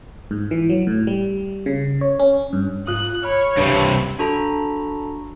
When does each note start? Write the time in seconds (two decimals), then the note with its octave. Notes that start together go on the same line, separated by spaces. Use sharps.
0.31 G#2
0.51 E3
0.70 F#3
0.87 A2
1.07 G3
1.66 C#3
2.01 C#5
2.20 C#4
2.53 G2
2.87 G#2 F4 D#6 F#6
3.23 C#5 B5 F6
3.57 C#2 G2 C3 B4 B5
4.19 D4 F#4 A4 A#5 B5